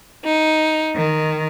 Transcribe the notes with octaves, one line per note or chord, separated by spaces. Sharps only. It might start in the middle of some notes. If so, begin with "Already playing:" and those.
D#4
D#3